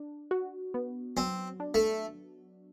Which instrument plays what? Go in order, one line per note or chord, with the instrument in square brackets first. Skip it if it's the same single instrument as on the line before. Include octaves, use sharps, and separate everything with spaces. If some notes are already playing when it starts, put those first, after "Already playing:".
Already playing: [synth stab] D4
F#4
B3
[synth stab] F#3 [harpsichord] C4
[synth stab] D4
[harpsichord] A3